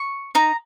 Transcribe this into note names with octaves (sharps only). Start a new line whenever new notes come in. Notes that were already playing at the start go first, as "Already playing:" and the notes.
Already playing: C#6
D#4 A#5